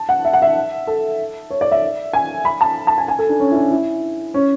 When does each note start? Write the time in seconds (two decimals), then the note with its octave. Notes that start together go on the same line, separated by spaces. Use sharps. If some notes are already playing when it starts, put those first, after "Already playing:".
Already playing: A5
0.09 F#5
0.25 E5
0.33 F#5
0.42 E5
0.87 A4
1.50 C#5
1.61 D5
1.71 E5
2.13 G#5
2.45 B5
2.61 A5
2.87 A5
2.98 G#5
3.08 G#5
3.19 A4
3.29 D4
3.40 C#4
3.51 E4
3.55 D4
3.71 E4
4.34 C#4